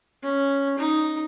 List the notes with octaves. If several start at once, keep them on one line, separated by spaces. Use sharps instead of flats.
C#4
D#4